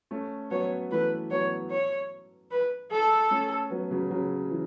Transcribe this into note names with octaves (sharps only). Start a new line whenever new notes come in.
A3 C#4
F#3 B3 C#5
E3 A3 B4
F#3 B3 C#5
C#5
B4
A4
A3 C#4
F#3 B3
C#3 F#3
C#3 F#3
E3